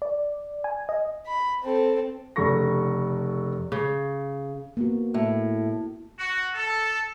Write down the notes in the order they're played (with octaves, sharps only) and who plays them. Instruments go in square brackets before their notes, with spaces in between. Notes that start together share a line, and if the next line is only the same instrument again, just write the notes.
[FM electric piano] D5
G#5
D#5
[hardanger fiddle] B5
C4 A4
[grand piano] F1 C#3 A4 C#6 A#6
[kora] C#3
[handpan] A#3 B3 F#4
[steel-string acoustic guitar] A2
[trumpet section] F#4
A4